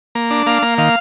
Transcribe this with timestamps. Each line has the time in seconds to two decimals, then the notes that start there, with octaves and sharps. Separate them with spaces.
0.15 A#3
0.31 D4
0.47 A#3 F5
0.62 A#3
0.78 D#3 F5